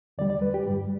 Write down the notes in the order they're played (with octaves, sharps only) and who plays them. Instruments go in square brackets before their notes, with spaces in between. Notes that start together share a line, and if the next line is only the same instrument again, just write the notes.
[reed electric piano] E2 D3 G3 D5
D5
B4
G4
G2 G3